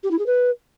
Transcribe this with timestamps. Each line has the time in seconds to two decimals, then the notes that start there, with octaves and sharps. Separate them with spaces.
0.03 G4
0.11 E4
0.18 G#4
0.26 B4